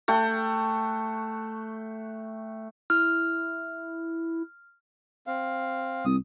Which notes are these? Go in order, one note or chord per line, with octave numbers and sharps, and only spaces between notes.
A3 F#5 G5
E4 F6
C4 F5
C2 D#6